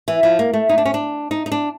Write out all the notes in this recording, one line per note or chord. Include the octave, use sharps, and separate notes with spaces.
E3
F3
A#3
A3
D#4
D4
C#4
D4
D#4
D#4
D4